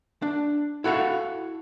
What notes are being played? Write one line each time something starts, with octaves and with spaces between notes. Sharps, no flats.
D4
E4 F#4 A4 F5 F#5